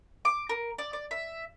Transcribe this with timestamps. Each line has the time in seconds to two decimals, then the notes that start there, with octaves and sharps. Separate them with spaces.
0.25 D6
0.49 A#4
0.78 D5
0.93 D5
1.11 E5